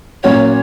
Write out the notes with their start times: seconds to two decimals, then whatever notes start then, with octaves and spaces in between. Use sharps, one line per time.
0.23 A#2 F#3 A#3 C#4 F#4 C#5